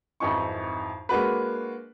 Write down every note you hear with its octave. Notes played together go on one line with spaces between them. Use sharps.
G#1 F2 E3 D#4 C#6
G#3 A#3 D4 F#4 B4